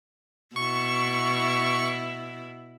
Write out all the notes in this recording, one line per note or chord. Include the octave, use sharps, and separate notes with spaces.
B2 E4 C#6